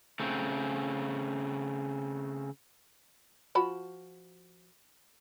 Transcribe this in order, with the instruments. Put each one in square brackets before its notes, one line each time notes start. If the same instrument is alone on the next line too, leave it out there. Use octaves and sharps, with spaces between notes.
[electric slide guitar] C#3 A3 C4
[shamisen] F3 F#4 B5